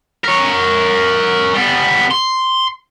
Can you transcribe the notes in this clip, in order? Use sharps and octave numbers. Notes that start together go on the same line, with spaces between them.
A#4 C#5
G3 B3
C6